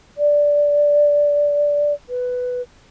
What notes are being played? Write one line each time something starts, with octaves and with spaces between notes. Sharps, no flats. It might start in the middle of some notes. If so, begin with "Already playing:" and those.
D5
B4